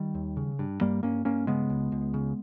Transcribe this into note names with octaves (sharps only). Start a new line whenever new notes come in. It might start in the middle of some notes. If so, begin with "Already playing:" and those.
Already playing: D#3 G3
D#2
C#3
G2
G2 G3 A#3
G2 A#3 C#4
G2 A#3 C#4
C#3 G#3 B3
C#2
C#2
C#3